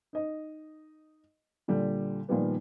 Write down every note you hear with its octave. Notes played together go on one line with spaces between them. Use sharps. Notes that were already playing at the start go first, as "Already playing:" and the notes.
D#4 D#5
A#2 D3 G3
A#2 D#3 F3 G3 B3